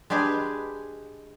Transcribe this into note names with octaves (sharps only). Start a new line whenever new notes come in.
G#3 D4 G4 G#4 B4